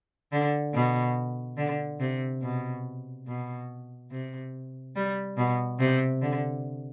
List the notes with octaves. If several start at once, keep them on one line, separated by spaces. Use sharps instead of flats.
D3
B2
D3
C3
B2
B2
C3
G3
B2
C3
D3